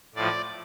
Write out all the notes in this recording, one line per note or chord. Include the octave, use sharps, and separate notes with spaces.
A2 F3 D5